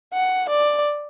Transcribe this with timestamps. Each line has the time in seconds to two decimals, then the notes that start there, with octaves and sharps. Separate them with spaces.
0.13 F#5
0.49 D5